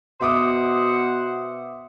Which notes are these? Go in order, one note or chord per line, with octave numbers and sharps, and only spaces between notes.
B2 C5 E5 F#5 D6 D#6